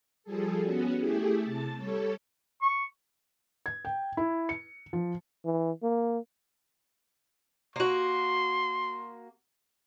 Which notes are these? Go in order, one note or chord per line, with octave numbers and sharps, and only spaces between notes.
F3 G3 G#4 A4
B3 C#4 F#4
A3 E4 G4 G#4
C3 A5 A6
G3 A4 C#5
C#6
G#6
G5
E4
C#7
F3
E3
A#3
A#3 F#4 C6